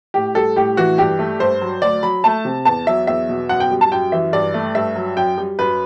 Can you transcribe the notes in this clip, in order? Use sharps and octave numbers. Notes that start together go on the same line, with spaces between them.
A2 G4
G3 A4
A2 G4
E3 F#4
G2 G4
A3
G2 C5
F#3
D2 D5
F#3 B5
A3 A5
C3
E2 A5
F#3 E5
E2 E5
B2
F#2 F#5
G5
G3
A5
F#2 G5
E3 E5
G2 D5
A3
G2 E5
F#3
F#2 G5
G3
F#2 B4